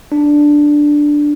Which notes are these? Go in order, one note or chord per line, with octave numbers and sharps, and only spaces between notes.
D4